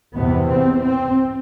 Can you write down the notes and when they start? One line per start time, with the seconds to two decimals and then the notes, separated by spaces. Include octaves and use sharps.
0.14 E2 C3 B3
0.49 C4
0.82 C4